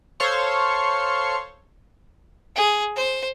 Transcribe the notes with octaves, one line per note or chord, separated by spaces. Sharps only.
A4 C5 C#5 F5 C6 C#6
G#4
C5